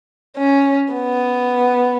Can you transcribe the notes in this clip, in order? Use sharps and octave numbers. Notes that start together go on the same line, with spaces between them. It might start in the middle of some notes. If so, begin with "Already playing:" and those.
C#4
B3